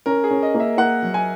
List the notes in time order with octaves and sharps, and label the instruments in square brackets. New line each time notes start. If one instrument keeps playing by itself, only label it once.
[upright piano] C#4 [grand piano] A#4
[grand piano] G#4
[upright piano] C#4
[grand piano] D#5
[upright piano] A#3
[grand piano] E5
[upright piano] A#3 [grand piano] F#5
[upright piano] F#3
[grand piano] G#5